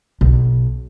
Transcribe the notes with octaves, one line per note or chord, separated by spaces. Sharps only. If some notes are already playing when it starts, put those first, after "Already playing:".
B1